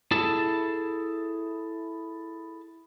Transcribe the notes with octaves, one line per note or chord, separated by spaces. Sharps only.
E4 G#4 A4 A5